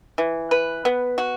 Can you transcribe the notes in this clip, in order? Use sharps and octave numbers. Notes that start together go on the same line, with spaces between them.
E3
B4
B3
F#4